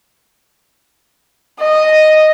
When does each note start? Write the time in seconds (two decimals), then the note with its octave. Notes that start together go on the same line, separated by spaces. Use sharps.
1.60 D#5